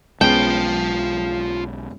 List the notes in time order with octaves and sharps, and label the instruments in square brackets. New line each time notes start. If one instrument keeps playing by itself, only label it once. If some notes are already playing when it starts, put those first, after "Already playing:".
[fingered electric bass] B1 G#3 [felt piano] B3 C#4 G#4 [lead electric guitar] F4 A5 [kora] G5